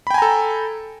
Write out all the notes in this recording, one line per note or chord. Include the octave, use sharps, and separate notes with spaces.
A4 G5 G#5 A#5 B5